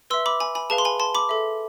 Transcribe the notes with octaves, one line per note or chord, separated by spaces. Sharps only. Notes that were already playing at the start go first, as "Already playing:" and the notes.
B4 E5 C6 E6
B5 D6
G#5 B5
G#5 B5
G#4 B4 F5 A5
C6
G#5 B5
A5 C6
B5 D6
A4 E5